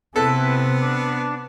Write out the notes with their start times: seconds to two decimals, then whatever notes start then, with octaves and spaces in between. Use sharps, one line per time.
0.16 C3 B3 C4 E4 A4 B4
0.80 D4